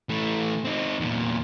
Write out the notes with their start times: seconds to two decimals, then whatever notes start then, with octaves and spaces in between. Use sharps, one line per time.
0.09 E3 A3
0.65 C4 D#4
1.00 E2 A#2